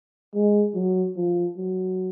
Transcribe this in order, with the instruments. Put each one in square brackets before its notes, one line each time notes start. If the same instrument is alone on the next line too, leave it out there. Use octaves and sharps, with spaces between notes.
[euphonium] G#3
F#3
F3
F#3